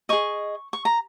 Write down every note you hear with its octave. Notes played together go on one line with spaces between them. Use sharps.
G#4 D#5 C#6
C#6
A#5